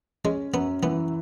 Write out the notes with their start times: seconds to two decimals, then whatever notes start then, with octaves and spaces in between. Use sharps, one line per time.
0.24 G#3 C#4
0.54 F#2 B3
0.83 E3 B3